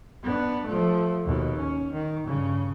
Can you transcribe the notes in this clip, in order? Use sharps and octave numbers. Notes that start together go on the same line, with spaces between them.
B3 D4
F3 A3
D#2 B2
C#4
D#3
G2 C#3